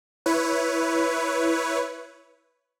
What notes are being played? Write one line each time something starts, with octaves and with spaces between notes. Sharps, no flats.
E4 B4 C#5